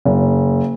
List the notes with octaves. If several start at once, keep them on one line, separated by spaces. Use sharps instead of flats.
F#1